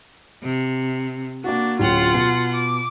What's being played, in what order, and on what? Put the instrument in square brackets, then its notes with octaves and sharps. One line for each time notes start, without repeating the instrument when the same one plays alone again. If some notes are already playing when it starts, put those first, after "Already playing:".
[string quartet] C3
[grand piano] A#3 F#4 [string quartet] D4
[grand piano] D1 C#4 G5 [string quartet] F4 F#5 C6
[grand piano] B2
[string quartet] D6